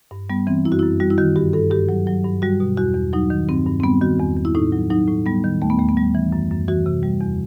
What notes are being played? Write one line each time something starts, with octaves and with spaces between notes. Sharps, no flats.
G2
G3 B3
E3 C4
F#2 E4
F#4
F#2 E4
G3 F#4
E4
D#3 F#4
G2 G4
G2 A4
G2 G4
F#3
F#3
G2
G3 F#4
B2
E2 F#4
E2
F#3 D#4
D#3
G2 C4
G2
C4
G3 B3
D#3 F#4
E2
E2
E4
A2 D#4
F#3
F#3 D#4
A2
G3 B3
D#3
D#2 A3
B3
D#2 A3
B3
G3
E3
F#2
F#2
E3 F#4
C3
G3
E2